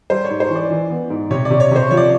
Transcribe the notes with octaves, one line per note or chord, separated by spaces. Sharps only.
G3 C5
C#5
G#2
C5
E3
D5
E3
B3
G#2
C3 C#5
D5
C3
C#5
C3 C5
F3 C#5
D5